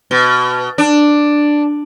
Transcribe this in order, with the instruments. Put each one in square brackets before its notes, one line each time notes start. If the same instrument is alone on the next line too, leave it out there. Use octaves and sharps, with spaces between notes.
[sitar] B2
D4